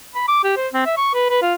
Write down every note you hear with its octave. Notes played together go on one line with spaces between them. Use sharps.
B5
D6
G4
C5
C4
E5
C#6
B4
B4
F4